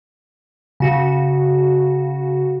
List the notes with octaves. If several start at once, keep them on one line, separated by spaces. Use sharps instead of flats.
C#3 F#4